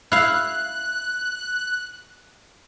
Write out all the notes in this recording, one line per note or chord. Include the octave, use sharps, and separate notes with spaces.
E4 F5 F#6